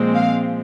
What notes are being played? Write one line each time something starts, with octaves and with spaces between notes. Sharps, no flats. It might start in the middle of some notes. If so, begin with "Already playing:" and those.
Already playing: A#2 F3 G#3 C4
F5